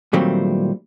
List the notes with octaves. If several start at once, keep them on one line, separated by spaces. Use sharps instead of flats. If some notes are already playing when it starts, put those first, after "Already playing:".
A#2 D#3 F#3 G3 A3 C4